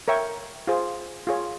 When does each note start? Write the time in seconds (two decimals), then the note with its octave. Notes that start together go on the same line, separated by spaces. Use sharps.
0.08 A#4 C#5 E5 G5 C#6
0.67 F4 G#4 C5
1.27 F4 G#4 C#5